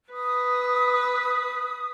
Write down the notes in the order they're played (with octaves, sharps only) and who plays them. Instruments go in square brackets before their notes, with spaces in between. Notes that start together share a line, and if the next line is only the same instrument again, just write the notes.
[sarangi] B4 [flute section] D#6